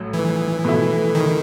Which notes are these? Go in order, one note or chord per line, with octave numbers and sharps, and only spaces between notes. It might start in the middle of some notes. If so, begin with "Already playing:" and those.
Already playing: A1 A2 F#3
E3
B2 A3 E4
D#3